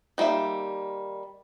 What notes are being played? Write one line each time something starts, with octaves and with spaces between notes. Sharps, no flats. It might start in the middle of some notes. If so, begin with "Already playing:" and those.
D#3 G3 A#3 E5